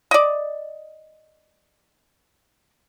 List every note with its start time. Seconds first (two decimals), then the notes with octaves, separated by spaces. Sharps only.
0.11 D5 D#5